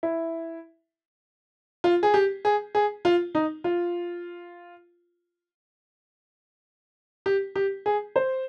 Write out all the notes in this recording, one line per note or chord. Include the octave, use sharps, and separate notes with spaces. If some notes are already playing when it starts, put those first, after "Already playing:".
E4
F4
G#4
G4
G#4
G#4
F4
D#4
F4
G4
G4
G#4
C5